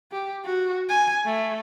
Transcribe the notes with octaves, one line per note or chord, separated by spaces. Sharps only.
G4
F#4
G#5
A3